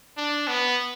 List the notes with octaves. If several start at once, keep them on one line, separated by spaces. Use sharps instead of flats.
D4
B3